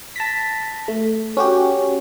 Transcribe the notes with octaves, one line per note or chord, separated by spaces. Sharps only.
A5 A#6 B6
A3
C#4 F#4 G4